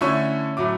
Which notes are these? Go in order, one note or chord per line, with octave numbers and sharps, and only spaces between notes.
D3 A3 C#4 E4 C#6
A2 F#3 A3 D6